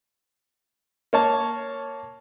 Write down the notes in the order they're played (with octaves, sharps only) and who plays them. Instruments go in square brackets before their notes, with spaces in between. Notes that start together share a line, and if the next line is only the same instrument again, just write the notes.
[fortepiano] A#3 C#5 A5